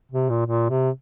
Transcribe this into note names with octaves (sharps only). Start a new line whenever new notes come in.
C3
A#2
A#2
C3